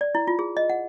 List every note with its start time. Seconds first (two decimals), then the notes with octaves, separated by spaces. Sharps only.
0.01 D5
0.15 E4
0.27 F4
0.39 G#4
0.57 D#5
0.70 F#5